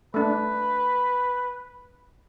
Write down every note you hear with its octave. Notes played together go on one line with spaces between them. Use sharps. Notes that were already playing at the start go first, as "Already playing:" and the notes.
A3 D4 B4